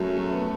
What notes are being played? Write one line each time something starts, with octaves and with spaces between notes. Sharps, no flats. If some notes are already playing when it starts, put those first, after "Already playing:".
Already playing: F#2 F#3 A3
A3
B3